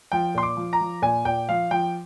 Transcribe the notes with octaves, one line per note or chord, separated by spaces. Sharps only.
F3 G5
A#2 C6
D6
F3
A#5
F3
A#2 G#5
A#2 G5
F3 F5
F3 G5